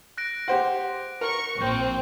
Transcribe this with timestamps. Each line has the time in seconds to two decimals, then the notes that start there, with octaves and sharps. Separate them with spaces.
0.18 F#6 A#6 D7
0.48 G4 C5 F#5
1.21 A#4 C#6
1.59 A#1 C4 C#6 G6